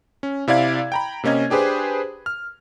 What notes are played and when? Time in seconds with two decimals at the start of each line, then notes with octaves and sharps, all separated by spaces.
0.23 C#4
0.48 C3 E4 D5 F5 G#6
0.92 G5 A#5 B5
1.23 C3 A#3 C#4 D#5 G#6
1.50 D4 G4 G#4 B4 C5
2.26 F6